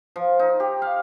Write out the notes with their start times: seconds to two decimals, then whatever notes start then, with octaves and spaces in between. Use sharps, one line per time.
0.16 F3
0.39 D#4
0.60 G4
0.82 F5